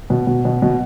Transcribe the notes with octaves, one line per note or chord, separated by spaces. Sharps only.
B2
B2
B2
B2